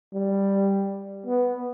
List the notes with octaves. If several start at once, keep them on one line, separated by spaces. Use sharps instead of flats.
G3
B3